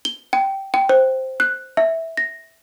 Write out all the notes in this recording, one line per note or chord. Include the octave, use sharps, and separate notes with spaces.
G7
G5
G5
C5
F#6
E5
A#6